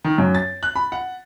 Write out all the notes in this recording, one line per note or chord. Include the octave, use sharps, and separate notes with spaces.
D#3
F#2
A6
F#6
B5
F#5